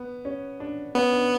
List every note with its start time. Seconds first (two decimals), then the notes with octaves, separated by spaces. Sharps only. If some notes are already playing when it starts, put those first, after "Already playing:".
Already playing: B3
0.25 C#4
0.60 D4
0.95 B3 C#4
1.12 D4